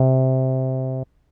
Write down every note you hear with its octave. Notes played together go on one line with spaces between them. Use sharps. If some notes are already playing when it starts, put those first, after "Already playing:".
Already playing: C3